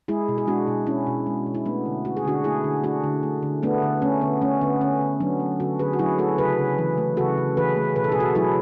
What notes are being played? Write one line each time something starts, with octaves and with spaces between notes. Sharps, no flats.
G#3 E4 G#4
B2
G#4
G#3 D4 F#4
B2
G#3 C#4 E4
B2
G#3
B2
E4
A3 B3 D4
D3
A3 F#4
G#4
D3 D4 F#4
A3 E4 G#4
D3
A3 D4 F#4
D3
A3
D3
A3 B3 D4
D3
A3 C#4
D3 B3
A3 C#4
D3 B3
D3 C#4
D3
F#3 B3 D4
A3
D3 F#4 A4
D3 G#4 B4
F#4
F#3 E4 G#4
A3 F#4 A4
C#3 G#4 B4
C#3
E3
A3
C#3 F#4 A4
C#3
E3 G#4 B4
A3
B2 B4
A4
G#4
B2 F#4 A4
F#3 E4 G#4